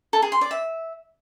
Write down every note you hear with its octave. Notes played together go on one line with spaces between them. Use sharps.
A4
G#4
C6
D5
E5